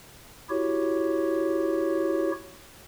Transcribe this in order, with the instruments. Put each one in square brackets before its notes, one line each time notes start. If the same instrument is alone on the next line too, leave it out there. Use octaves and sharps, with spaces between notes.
[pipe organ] E4 F#4 G4 C#5